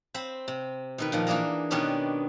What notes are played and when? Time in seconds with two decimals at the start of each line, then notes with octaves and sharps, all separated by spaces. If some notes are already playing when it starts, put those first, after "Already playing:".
0.14 C4 C5 B5
0.48 C3
0.98 B2 D#3 B4
1.12 A#2 D#3 F3
1.27 E3 A#3 D4 G#4 A#5
1.70 B2 D#3 B3 C#4 D4 G4